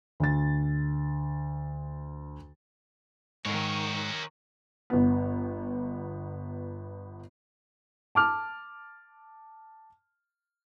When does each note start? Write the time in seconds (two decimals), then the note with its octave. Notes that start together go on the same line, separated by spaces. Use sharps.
0.20 D2 A6
3.45 G#2 D#3 A#4 C#5
4.90 G1 B3
8.15 A5 D6 F6